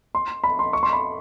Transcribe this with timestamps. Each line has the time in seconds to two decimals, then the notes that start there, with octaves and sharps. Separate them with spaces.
0.15 C6
0.44 B5
0.59 C6
0.73 C#6
0.83 C6
0.93 B5